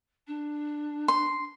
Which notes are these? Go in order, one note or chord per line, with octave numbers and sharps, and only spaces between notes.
D4
C6